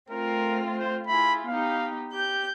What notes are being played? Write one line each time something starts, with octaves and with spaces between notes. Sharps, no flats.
A3 C4 F4 A#4
C5
E4 F4 G#4 B5
B3 D#4 G4 F5
G4 G6